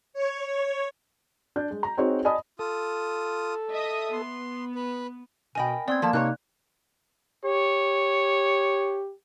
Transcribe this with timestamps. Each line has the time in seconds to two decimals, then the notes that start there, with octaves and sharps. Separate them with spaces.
0.13 C#5
0.47 C#5
1.56 D4 G6
1.70 G#3
1.83 A#5
1.97 C4 D#4 F#4 G#4 C5 C#5
2.25 D5 D#5 G#5 A5 B5 D#6
2.59 F4 A4 D#6
3.70 D#5 E5 D#6
4.12 B3 C6
4.75 B4
5.55 B2 A#4 D#5 G5 G#5 B5
5.88 B3 C4 D5 C6 G#6
6.02 F3 A#3 A4 A5
6.13 G#2 C3 D#4 A4 C#5 F#6
7.45 G4 C#5